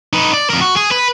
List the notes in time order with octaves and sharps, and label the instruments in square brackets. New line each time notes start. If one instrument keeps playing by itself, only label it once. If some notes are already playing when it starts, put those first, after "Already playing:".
[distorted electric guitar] D#4 B4
D5
F2 A#4
F#4
G#4
B4